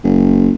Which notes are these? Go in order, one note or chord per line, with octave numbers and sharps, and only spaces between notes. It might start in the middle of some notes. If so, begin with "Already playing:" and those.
F#1